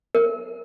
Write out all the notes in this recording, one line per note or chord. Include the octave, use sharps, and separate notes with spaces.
A#4